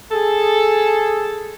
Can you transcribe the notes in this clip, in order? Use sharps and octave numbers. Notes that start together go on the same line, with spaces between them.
G#4 A4